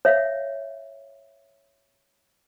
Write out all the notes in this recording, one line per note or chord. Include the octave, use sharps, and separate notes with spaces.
C#5 E5 F5